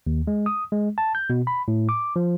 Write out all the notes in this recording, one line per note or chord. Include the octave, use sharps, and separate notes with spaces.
D#2
G#3
D#6
G#3
A5
G6
B2
B5
A2
D6
F3